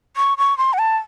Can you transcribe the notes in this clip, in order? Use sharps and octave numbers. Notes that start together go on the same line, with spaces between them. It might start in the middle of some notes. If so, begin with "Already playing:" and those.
C#6
C#6
C6
F#5
A5